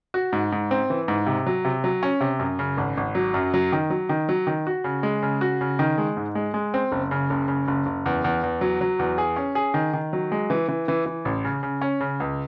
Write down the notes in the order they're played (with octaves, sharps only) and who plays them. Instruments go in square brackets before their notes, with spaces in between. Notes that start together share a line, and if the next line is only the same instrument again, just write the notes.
[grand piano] F#4
G#2
G#2
C4
E3
G#2
C3
F#3
C3
F#3
C#4
C3
F#2
C#3
G#1
G#1
F#3
F#2
F#3
D#3
F#3
D#3
F#3
D#3
F#4
C#3
G#3
C#3
F#4
C#3
D#3
G#3
G#2
G#3
G#3
C4
F#1
C#3
F#1
C#3
F#1
F#1
E2
E2
E2
F#3
F#3
E2
G#4
C#4
G#4
D#3
D#3
F#3
G#3
E3
E3
E3
E3
A1
C#3
C#3
C#4
C#3
C#2